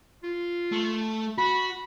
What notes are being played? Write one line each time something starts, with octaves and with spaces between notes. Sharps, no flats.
F4
A3
F#4 B5